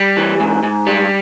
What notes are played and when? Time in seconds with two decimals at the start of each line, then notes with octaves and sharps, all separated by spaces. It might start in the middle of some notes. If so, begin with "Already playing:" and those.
Already playing: G3
0.17 E3
0.40 G#2
0.63 G#2
0.86 G3